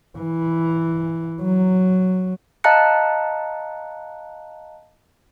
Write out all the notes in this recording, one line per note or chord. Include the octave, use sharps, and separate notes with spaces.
E3
F#3
D#5 F5 A5 A#5 F#6 C#7